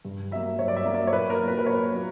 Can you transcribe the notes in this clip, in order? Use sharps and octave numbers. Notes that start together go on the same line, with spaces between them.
G2
F#3 A#3 E5
G2 C#5
D5
E5
F#3 A#3
D5
C#5
A#2 B4
A#4
F#3 A#3
B4
B4
A#2 C#5
F#3 A#3